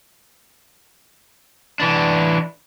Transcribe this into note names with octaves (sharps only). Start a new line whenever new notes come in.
E3 D4